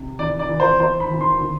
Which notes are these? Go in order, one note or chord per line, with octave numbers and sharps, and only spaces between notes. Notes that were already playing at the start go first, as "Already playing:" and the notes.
Already playing: C3
E3 D5
D5
E3
C5
E3 C5
B5
E3
C6
D3